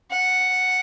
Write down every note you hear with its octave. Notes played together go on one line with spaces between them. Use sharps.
F#5